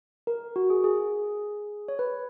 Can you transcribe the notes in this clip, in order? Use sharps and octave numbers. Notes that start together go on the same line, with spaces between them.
A#4
F#4
G#4
G#4
C#5
B4